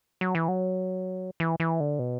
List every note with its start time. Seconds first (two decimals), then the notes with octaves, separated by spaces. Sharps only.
0.21 F#3
0.35 E3
0.48 F#3
1.40 E3
1.60 E3
1.80 D3
1.99 B2